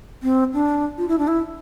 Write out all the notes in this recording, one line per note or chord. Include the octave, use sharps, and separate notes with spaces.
C4
D4
F4
E4
D4
E4